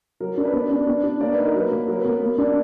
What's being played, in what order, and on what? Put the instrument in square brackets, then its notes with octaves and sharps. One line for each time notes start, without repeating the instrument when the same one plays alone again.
[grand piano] F#3 A#4
D4 A#4
B4
B3 D5
D4
B3
D4
A#3 D5
B4
D#4
A#4
F#3 B4
A#3
F#3 A#4
B4
B3 A#4
A#3
D4